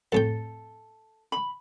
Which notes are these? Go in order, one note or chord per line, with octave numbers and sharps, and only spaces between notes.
F2 A2 A4 G5
B5